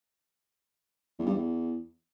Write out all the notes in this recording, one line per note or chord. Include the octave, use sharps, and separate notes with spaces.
E2
G2
E2